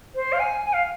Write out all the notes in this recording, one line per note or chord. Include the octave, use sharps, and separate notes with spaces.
C5
F5
G#5
G#5
F5